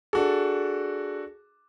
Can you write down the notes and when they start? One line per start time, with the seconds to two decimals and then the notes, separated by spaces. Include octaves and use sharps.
0.13 D4 F#4 G#4 A4